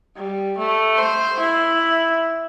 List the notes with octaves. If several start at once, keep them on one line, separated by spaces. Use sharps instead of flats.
G3
A3
C5
E4